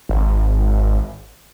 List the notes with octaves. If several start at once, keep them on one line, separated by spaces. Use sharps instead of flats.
G#1